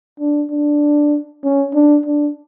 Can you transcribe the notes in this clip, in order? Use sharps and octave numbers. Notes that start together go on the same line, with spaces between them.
D4
D4
C#4
D4
D4